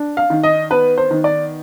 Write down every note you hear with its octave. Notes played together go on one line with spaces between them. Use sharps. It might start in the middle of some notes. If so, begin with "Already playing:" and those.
Already playing: D4
F5
D#3
D#5
B3 B4
C5
D#3
D5